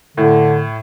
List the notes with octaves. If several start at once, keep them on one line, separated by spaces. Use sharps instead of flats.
A2 D3